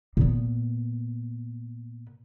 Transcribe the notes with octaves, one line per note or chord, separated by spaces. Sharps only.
A#2 B3